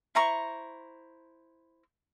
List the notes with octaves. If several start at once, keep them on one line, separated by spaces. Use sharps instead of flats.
E4 C5 A#5 C#6